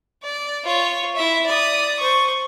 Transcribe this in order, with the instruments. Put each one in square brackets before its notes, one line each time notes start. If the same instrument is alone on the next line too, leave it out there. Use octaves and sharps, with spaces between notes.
[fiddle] D5
F4 C#5
E4 E5
D5 D#6
C5 C#6